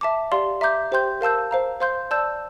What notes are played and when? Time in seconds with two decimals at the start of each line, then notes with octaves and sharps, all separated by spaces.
0.01 E5 A5 D6
0.32 G4 D5 F5 C6
0.61 E5 A#5 D6 G6
0.92 G4 C5 G5 C6 G6
1.21 A#4 F5 A5 E6 G6
1.51 C5 F5 A#5
1.80 C5 F5 C6 G6
2.11 D5 A5 E6 G6